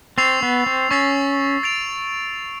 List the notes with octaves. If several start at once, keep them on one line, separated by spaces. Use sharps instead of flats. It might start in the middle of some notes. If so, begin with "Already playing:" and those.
C4 C#6 E6 A6 C7 F7
B3
C4
C#4 C#6 E6 A6 C7 F7
A6 D7 F7